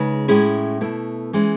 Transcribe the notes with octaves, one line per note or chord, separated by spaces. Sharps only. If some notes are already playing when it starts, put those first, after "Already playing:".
Already playing: C#3 G#3 D#4 B4
A2 G#3 C#4 E4 G#4
B2 A3 E4
E3 G#3 C#4